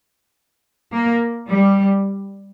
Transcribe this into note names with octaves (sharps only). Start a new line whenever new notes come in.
A#3
G3